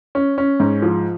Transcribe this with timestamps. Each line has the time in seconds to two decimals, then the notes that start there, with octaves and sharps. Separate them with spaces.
0.15 C#4
0.38 C#4
0.60 G#2
0.82 F3